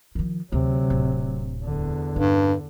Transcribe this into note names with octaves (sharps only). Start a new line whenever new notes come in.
D#3 F3
D2 C3 F#3
D1
E2 D3
G2 C#4